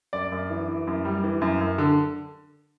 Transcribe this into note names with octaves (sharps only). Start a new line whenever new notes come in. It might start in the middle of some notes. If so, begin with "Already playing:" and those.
F#2 D5
F#2
E3
E3
F#2
G3
E3
F#2
F#2
D3